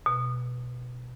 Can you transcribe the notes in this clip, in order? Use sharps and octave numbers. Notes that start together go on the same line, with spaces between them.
B2